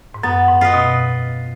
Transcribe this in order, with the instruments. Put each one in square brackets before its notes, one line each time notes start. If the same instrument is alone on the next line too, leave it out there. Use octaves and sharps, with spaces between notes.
[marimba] G#2
[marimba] F#2 [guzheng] B3
[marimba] G#2
[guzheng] F4 B4 D#5
[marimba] B2